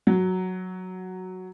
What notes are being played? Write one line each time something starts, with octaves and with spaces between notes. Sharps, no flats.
F#3